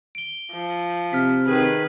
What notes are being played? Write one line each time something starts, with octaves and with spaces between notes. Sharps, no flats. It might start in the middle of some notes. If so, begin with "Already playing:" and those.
D7 G7
F3
C3 F6 B6
D#3 G#4 B4 G#5